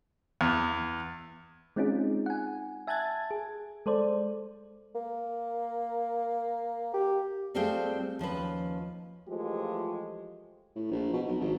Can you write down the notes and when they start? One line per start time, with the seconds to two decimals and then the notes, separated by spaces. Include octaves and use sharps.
0.41 E2
1.76 G#3 C4 C#4 D#4 F4 G#4
2.26 F#5 G#5
2.87 E5 G#5 A5 F#6 G#6 A6
3.31 G#4
3.86 G#3 A4 C5 D5
4.95 A#3
6.94 G4
7.54 G3 A3 C4 F4 G#4 G5
8.19 D#2 F3 C#4 B4
9.28 E3 F3 G#3 A3 F4 G4
10.76 A2
10.91 A#1
11.13 B2
11.27 B1
11.40 G#1